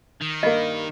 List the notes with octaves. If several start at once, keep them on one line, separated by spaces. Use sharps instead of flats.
D#3
G2 A#3 D#5